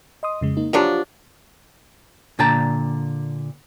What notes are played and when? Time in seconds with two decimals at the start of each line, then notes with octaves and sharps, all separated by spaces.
0.23 D#5 C6 D#6
0.41 F2 C#3 G#3
0.57 A#3 D#4
0.73 F3 F#3 D4 F4 G4
2.39 A#2 D3 G5 A5 A#5